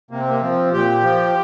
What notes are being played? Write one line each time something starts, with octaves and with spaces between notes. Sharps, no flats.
C3 A#3
C4
A#3
F3 C4
A#2 G4
F3